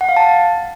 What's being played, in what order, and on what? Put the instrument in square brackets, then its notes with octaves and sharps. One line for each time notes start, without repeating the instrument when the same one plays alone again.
[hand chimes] F#5
F5
A5